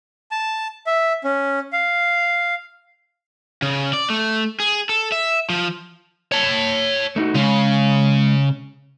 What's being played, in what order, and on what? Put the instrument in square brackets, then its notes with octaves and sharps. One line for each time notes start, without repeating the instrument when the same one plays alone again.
[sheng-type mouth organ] A5
E5
C#4
F5
[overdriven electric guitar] C#3
D5
A3
G#4
A4
E5
F3
[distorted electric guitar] C#5 A5
[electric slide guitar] A3 D#4 F#4
[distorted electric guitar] C#3 [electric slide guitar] G#3